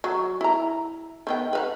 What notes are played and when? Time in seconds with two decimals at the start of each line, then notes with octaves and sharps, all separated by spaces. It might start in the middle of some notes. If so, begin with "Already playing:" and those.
0.04 F#3
0.41 E4 A#5
1.27 D#3 B3 G5
1.53 B4 F5 F#5